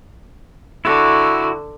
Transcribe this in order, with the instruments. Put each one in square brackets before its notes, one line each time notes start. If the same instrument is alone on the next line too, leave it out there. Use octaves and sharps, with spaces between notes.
[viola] D3 [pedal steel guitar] E4 F#4